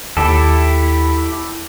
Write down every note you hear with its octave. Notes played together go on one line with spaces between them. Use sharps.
D#2 E4 G4 A4